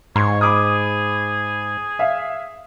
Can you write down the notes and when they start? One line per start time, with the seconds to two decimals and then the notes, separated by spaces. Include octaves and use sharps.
0.16 G#2 C#5 C6
0.41 G#4 B5 D6 D#6
1.99 E5 F5